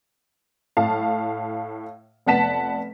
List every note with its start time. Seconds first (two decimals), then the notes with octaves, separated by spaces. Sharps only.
0.77 A2 F5 A5
2.26 F1 B3 F#5 A5 B6 E7